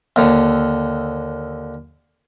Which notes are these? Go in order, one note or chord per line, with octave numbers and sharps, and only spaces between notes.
D#2 D3